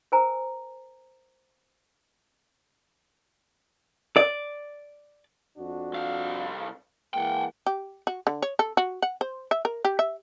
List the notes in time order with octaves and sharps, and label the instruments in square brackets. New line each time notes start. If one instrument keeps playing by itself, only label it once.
[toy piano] A#4 C5 G#5 A#5
[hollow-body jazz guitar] D5
[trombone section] F2 D4 F#4
[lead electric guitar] C2 F5
[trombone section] E3 G#3 A#3 [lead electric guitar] F#5 G5
[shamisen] G4
F#4
D3
C#5
A4
F#4
F#5
C5
E5
A#4
G4
E5